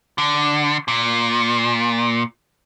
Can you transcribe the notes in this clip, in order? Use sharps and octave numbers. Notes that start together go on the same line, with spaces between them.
D3
A#2